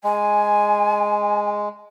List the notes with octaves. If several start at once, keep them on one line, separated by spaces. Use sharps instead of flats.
G#3 G#5